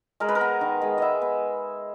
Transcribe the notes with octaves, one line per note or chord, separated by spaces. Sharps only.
G#3 A#4
B4
A#4
B3
D#3
G#3
B3 D#5 E5
B3